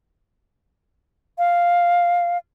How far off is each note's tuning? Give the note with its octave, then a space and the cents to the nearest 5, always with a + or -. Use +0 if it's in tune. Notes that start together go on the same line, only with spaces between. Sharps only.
F5 +0